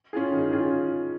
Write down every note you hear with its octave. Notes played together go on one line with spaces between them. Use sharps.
C#4 F4 G#4
D#3
C#4 F4 G#4